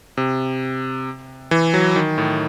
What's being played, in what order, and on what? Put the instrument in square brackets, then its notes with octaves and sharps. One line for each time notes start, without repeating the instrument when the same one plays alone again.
[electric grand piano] C3
E3
F#3
D#3
A2